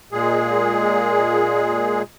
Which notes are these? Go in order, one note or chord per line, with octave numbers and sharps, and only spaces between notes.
A#2 G#3 G#4